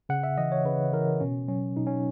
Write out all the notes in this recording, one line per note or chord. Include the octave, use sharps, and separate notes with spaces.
C#3 F#5
E5
E3 D#5
C#5
C#3 B4
E3 A#4
B2 C#4
F#3 C#4
B2 D#4
C#4